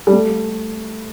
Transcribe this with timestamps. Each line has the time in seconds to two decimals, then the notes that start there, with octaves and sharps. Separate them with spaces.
0.07 G3
0.12 A3